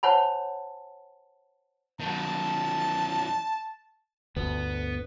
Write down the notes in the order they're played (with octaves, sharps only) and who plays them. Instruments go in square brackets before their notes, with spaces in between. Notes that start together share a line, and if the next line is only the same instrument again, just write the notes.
[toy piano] C5 C#5 F#5 G#5 A5 B5
[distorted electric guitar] D#3 F#3 [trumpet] A5
[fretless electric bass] G1 D2 [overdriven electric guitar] B3